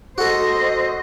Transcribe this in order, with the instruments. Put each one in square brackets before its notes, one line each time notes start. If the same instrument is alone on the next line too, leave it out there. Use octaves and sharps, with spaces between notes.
[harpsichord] F#4 A4 [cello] C5 D#5